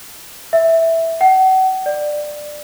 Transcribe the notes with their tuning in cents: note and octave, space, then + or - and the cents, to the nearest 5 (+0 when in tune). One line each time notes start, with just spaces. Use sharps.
E5 -5
F#5 +35
D5 +15